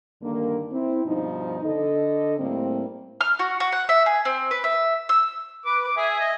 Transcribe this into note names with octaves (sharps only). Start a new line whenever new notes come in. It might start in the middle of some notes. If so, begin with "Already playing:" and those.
G2 D3 D#3 A#3
C4 E4
G2 B2 F3 D#4
D3 A4 D#5
A2 G3 A#3 C4
F6
F#4
F#4
F#5
E5
G#4
C4
B4
E5
E6
B4 D6
D6
G#4 E5 G#5
D#5